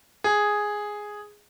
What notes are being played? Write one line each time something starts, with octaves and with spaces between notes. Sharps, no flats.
G#4